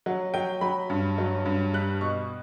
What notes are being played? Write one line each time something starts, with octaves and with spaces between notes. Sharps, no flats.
F#3 F#5
F#3 G5
F#3 B5
G2
F#3
G2
G3 F#6
B2 C#6